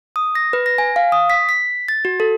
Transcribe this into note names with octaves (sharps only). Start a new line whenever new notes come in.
D#6
A#6
B4
A#6
G#5
F5
D#6
B6
B6
A6
F#4
A4